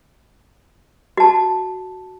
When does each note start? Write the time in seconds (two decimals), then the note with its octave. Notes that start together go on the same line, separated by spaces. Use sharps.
1.17 F#4 A5